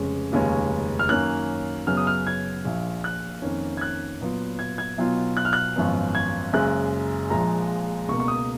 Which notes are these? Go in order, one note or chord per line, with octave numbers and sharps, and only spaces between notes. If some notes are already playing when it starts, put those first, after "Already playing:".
Already playing: F1 F2 C#3 G#3 C#4
F1 D#2 C#3 G#3 C#4
F6
F#2 D#3 A#3 C#4 F#6
F#2 C#3 F#3 B3 F6
D#6
F6
G#6
A#1 A#2 F3
F#6
F2 D#3 A#3 C#4
G#6
F#6
A#2 F#3 B3 F4
G#6
G#6
B1 B2 F#3 B3 F4
F#6
F6
F#6
G#1 F#2 F3 B3
G#6
F#1 F#2 C#3 G#3 F#6
A#1 A#2 F3 G#3 A#5
C#2 B2 A#3 C#6
C#6
D#6